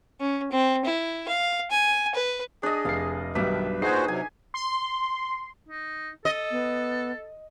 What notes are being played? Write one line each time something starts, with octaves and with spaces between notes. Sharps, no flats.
C#4
C4
E4
F5
G#5
B4
D4 G#4 D#5
F1 F5 C7
B1 G2 D#3 B4 E5 D6
A#2 D#4 F#4 G#4 C5 G#5 C7
C3 F#3 G#5
C6
D#4
A4 D#5
B3